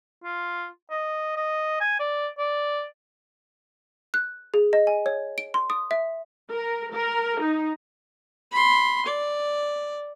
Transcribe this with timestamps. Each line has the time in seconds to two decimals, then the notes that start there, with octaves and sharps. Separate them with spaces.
0.24 F4
0.91 D#5
1.37 D#5
1.81 G#5
2.00 D5
2.38 D5
4.14 F#6
4.54 G#4
4.73 D#5
4.87 G#5
5.06 C#5
5.38 D7
5.54 C6
5.70 D#6
5.91 E5
6.51 A#4
6.94 A#4
7.41 D#4
8.51 B5 C6
9.06 D5